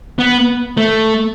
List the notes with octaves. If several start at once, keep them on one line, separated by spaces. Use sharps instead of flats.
B3
A3